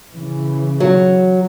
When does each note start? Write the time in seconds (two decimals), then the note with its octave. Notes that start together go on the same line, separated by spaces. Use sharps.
0.12 C#3 E3
0.80 F#3